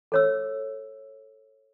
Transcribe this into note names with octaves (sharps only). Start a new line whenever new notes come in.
A4 C#5 E6